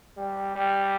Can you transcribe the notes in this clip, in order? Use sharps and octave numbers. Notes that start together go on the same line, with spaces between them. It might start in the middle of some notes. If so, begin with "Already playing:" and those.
G3
G3